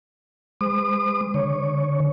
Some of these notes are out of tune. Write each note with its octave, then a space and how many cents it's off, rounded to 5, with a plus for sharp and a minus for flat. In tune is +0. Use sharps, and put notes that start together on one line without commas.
G#3 -30 C5 -40 D#6 -45
D3 +0 C#5 +0